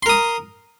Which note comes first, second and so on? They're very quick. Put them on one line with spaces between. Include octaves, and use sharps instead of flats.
C6 A#4 D#6